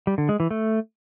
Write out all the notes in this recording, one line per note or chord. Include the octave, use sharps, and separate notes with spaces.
G3
D3
G#3
E3
A3